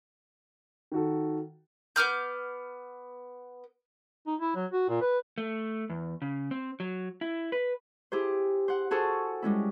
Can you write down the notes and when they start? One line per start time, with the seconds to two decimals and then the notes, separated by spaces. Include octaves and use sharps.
0.92 D#3 F#4 A4
1.96 B3 D6 F6 G6
4.27 D#4
4.41 E4
4.56 F#3
4.72 F#4
4.89 A#2
5.01 B4
5.38 A3
5.90 E2
6.22 C#3
6.51 C4
6.80 F#3
7.21 E4
7.52 B4
8.12 E4 G4 G#4 C5
8.68 C5 F#5
8.91 F#4 G#4 A4 C5 A5 C#6
9.42 G3 G#3 C#4 E4